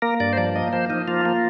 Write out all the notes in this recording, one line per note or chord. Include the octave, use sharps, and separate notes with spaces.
A#3 A#4
G2 D5
C5
F3 D5
A#3 D#5
F3 C5
F3 D#4
A#3 F4
A#3